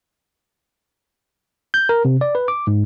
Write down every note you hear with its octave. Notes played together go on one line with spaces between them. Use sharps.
G6
A#4
C3
D5
B4
D6
G#2